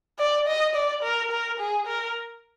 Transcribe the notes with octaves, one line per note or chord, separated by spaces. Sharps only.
D5
D#5
D5
A#4
A#4
G#4
A#4